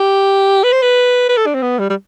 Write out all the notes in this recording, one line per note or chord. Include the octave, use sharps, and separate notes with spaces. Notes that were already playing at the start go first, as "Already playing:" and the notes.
Already playing: G4
B4
C5
B4
B4
A4
D4
C4
B3
G3
G3